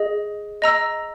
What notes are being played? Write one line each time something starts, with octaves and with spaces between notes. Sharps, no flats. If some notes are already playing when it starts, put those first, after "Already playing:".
Already playing: G#4 D#5
D#5 A#5 E6